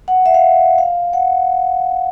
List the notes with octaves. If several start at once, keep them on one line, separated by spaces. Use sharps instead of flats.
F#5
E5
F5
F5
F#5